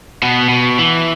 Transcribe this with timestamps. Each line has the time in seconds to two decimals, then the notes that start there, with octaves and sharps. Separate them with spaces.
0.23 B2 B3
0.49 B2
0.79 E3